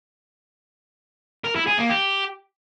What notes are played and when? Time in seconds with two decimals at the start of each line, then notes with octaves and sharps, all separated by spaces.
1.44 A#4
1.55 E4
1.67 G#4
1.78 A#3
1.89 G4